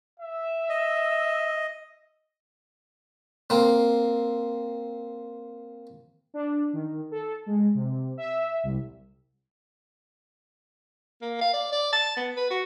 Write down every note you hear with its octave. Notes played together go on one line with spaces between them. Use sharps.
E5
D#5
A#3 C4
D4
D#3
A4
G#3
C3
E5
C2
A#3
F5
D5
D5
A5
B3
B4
F#4